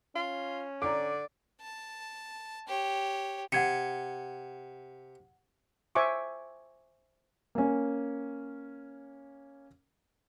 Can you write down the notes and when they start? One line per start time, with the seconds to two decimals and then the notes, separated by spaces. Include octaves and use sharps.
0.15 C#4 F4
0.82 D3 D5 A#5 D6
1.61 A5
2.67 G4 C#5
3.52 C3 F#5 G#6 C#7
5.95 C5 E5 G#5 C#6 D6
7.55 A#3 C#4